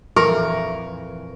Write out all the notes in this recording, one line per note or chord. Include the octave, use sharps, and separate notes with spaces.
F2 A#2 E3 A#4 C#6